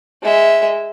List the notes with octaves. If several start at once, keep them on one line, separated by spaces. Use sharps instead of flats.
G#3 E5